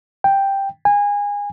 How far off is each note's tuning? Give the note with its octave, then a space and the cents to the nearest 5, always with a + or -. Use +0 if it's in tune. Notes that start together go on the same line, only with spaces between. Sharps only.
G5 +5
G#5 -25